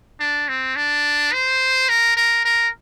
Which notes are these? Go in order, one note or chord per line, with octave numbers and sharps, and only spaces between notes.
D4
C4
D4
C5
A#4
A#4
A#4